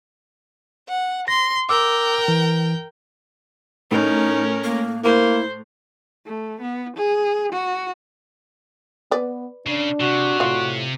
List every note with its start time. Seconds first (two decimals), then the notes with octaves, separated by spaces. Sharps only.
0.88 F#5
1.28 C6 A#6
1.69 A#4 G5 D6 E6
2.28 E3
3.91 A2 C#4 D#4 A#4
4.64 A#3
5.04 A#3 E4 C5
6.26 A3
6.61 B3
6.97 G#4
7.53 F#4
9.11 B3 B4 D5
9.66 C#3 D4
10.01 C3 F#4
10.40 A2 F4 D5